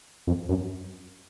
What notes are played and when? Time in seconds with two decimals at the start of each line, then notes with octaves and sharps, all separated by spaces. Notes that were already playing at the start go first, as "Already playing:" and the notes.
0.27 F2
0.49 F#2